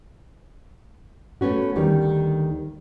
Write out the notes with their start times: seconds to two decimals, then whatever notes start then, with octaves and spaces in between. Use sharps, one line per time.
1.41 A3 B3 C#4 F#4
1.76 D2 D#3 G3